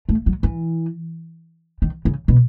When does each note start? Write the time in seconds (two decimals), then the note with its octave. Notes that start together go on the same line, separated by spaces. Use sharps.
0.09 A3
0.26 F#3
0.43 E3
1.82 D#3
2.05 C#3
2.28 B2